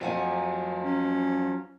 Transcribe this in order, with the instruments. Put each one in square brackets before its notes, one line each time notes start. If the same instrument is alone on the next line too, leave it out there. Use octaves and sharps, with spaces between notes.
[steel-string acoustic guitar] F2 F#5 G#5 [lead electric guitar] F#3 F4
[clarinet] C#4